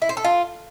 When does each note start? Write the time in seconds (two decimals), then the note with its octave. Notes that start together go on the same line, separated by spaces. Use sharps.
0.02 E4
0.09 C5
0.17 A4
0.24 F4